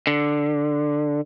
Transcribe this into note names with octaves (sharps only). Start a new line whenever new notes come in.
D3